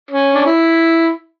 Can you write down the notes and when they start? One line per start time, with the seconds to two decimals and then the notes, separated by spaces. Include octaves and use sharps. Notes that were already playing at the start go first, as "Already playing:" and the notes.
0.11 C#4
0.34 D4
0.46 E4